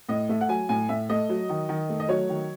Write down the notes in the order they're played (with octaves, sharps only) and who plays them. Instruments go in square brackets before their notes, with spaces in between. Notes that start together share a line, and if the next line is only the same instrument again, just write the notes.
[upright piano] A2 D#5
A3 E5
F#5
F#3 G#5
A2 G#5
A2 E5
A3 D#5
F#3
D#3
D#3
A3
D#5
F#3 C#5
D#3